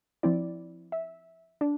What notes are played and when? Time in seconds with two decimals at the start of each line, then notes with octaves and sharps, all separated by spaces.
0.23 F3 C4 E4 D5
0.92 E5
1.61 D4